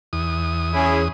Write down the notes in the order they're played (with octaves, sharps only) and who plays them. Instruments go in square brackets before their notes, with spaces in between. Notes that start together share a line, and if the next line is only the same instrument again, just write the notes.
[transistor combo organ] E2 D#6
[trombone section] C#4 E4 G#4